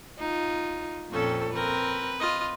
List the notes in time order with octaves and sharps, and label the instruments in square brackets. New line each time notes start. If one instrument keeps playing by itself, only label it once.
[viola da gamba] D#4 F4
[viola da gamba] F2 A#2 C4 [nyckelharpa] C#4 A4
[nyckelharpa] C4 A#4 [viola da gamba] B4
[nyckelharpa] F4 D#5